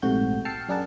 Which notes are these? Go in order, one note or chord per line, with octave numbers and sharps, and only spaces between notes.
A#1 G#2 C3 A3 F#4 G6
G5 A5 E6 F6 C7 C#7
F#2 D4 G#4 A#4 F#5 A5